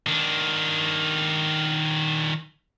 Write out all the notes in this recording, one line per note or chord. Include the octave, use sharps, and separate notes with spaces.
D#3 D4